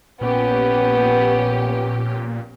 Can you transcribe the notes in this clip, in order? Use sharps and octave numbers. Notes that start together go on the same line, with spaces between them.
A#1 A#2 B3 C#4 G4